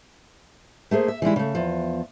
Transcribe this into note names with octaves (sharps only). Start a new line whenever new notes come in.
A3 A#3 G#4 C5
E5
E3 G3 G#3 E4
C#3 A3
E2 F3